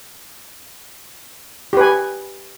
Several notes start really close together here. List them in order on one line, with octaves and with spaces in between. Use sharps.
G4 B4 G#5